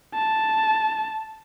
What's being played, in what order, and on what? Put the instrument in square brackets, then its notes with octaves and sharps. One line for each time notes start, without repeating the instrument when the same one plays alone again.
[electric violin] A5